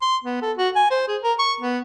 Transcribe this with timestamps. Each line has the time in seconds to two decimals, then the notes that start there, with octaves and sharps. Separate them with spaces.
0.02 C6
0.24 B3
0.42 A4
0.58 F#4
0.76 G#5
0.91 C5
1.08 G#4
1.23 A#4
1.39 C#6
1.61 B3